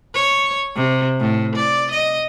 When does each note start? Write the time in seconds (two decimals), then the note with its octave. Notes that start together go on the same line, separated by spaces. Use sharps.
0.15 C#5
0.76 C3
1.20 A2
1.56 D5
1.92 D#5